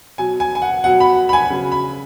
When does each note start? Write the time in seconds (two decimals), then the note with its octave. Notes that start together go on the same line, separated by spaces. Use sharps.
0.18 B2 F#3 G#5
0.40 G#5
0.55 G#5
0.62 F#5
0.84 B2 F#3 F#5
1.00 B5
1.29 B5
1.33 G#5
1.50 C#3 F#3
1.72 B5